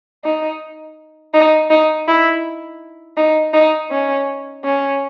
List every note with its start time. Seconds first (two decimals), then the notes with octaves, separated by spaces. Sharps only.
0.24 D#4
1.34 D#4
1.70 D#4
2.08 E4
3.17 D#4
3.53 D#4
3.91 C#4
4.64 C#4